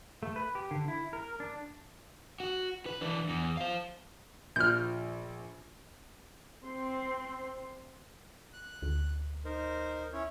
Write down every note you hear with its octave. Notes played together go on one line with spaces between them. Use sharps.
A3
B4
G4
D3
E4
A#4
D4
F#4
B4
E3 D4
E2
C5 F5
A#1 F3 F6 G6
C4 C6
F#6
D2
D#4 A#4 C5
C#4 E4 C#5